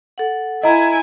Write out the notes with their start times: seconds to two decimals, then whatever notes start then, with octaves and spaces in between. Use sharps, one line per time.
0.18 A4 F#5
0.63 E4 D#5 G#5 A#5